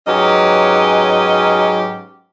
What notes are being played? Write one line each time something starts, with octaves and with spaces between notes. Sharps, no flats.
G#2 F#3 C#4 G4 B4 D#5